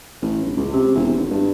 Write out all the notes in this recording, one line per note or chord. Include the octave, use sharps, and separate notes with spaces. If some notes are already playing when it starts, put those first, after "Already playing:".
A1
G1
C#2
C3
E1
G#1
G2